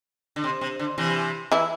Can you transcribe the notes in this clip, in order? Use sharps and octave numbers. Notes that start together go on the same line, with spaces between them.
D3
C3
C3
D3
C3 E3
E3 E4